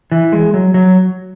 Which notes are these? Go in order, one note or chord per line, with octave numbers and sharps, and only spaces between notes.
E3
G#3
F#3
F#3